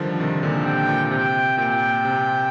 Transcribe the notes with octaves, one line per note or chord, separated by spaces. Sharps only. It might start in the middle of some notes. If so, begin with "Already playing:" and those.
Already playing: D3 D#3 F3 G3
C3 D#3
A#2 D3
C3 G5
A#2
C3 G5
A#2 G5
C3